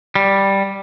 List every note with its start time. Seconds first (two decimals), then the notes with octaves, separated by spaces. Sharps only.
0.15 G3